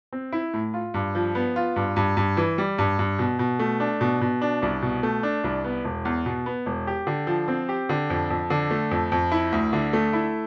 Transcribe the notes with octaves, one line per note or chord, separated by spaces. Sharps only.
C4
E4
A2
F4
G2
F3
B3
F4
G2
G2
G2
E3
G3
G2
G2
B2
B2
A3
D4
B2
B2
D4
C2
B2
A3
D4
C2
B3
E1
E2
B2
B3
E1
G4
D3
F3
C4
G4
D3
F2
F2
D3
A3
F2
F2
E4
D2
D3
A3
E4